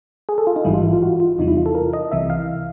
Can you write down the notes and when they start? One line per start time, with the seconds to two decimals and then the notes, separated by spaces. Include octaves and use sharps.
0.29 G#4
0.38 A4
0.47 F4
0.56 D#4
0.65 A1 G#2 E3 G3 E4
0.74 F4
0.83 E4
0.93 F4
1.02 F#4
1.20 F4
1.38 E2 C3 E3 G3 D#4
1.48 E4
1.57 F4
1.66 A4
1.75 A#4
1.93 D#5
2.11 C2 C3 E3 E5
2.30 F5